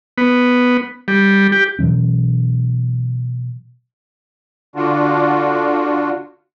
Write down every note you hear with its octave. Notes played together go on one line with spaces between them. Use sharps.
B3
G3
G4
B2 E3 F#3 C#4
D3 D4 F4 F#4